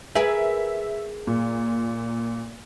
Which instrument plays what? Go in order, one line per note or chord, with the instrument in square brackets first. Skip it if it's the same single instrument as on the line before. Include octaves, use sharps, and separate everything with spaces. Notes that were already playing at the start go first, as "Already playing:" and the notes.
[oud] G#4 A#4 B4 [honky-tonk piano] E5
[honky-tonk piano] A#2